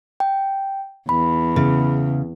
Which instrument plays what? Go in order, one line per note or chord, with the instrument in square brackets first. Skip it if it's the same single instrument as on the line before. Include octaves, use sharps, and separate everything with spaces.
[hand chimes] G5
[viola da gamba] E2 [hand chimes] B5
[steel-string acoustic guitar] C#3